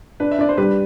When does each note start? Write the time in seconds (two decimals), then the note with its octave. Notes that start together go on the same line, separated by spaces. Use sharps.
0.20 D4 B4
0.31 E5
0.39 D4 D5
0.49 C5
0.58 G3 B4